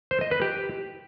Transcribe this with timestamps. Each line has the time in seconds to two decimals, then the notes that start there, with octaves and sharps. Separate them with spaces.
0.11 C5
0.21 D#5
0.31 B4
0.42 G4